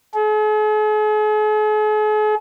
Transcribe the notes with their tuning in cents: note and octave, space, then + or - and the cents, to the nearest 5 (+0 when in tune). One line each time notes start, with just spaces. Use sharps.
G#4 +45